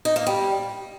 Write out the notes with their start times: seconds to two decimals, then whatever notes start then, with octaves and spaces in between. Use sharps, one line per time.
0.05 D#4
0.16 A#3
0.27 G3